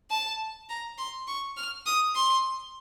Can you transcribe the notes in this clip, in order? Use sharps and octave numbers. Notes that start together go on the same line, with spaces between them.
A5
A#5
C6
C#6
F6
D#6
C6